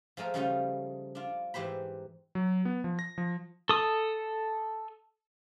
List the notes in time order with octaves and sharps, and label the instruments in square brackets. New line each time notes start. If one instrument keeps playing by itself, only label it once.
[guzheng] F3 G#3 A3 A#4
C#3 F3 G3 A3 D#4 F4
D4 F4
G#2 E3 G4 C5 B5
[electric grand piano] F#3
B3
F3
A#6
F3
[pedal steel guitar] A4 D#6